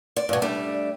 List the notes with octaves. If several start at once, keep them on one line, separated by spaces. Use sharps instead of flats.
D5
G2 B2
G3 A3 D4